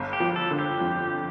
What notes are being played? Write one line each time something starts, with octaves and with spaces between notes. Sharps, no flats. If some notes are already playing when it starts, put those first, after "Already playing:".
Already playing: G1
G4
F3
A4
D3
G4
F2